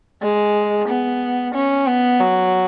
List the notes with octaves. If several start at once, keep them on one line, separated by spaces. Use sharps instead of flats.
G#3
B3
C#4
B3
F#3